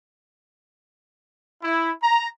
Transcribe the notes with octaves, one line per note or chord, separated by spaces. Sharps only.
E4
A#5